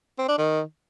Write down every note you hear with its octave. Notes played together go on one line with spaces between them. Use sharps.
C4
D4
D#3